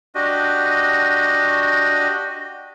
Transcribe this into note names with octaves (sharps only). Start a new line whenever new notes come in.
D4 F#4 G4 D#5